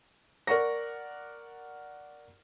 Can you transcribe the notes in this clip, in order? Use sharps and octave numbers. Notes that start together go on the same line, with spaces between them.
A#4 D5 F#5 C#6 A#6